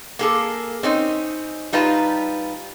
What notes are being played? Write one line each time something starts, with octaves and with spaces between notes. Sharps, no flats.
A#3 G#4 A4
C4 C#4 D#4
G3 D#4 F4 B4 A5 A#5